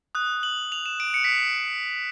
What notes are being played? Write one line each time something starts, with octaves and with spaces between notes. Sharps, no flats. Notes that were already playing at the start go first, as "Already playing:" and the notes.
D#6 F#6
F#7
F7
E7
D7
C#7
B6
C7